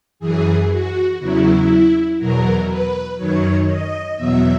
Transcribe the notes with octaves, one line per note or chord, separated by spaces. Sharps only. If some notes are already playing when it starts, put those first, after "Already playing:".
F#2 E3 G#4
F#4
E2 C#3 F#3 E4
E2 B2 F#3 A#4
B4
F#2 D#3 F#3 C#5
D#5
E2 B2 F#3 E5